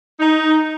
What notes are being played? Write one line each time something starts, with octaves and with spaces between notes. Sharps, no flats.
D#4